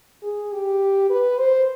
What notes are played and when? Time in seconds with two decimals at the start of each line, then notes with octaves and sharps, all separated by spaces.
0.22 G#4
0.52 G4
1.10 B4
1.39 C5